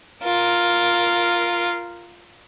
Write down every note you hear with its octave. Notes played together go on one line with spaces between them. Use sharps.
F4 A#4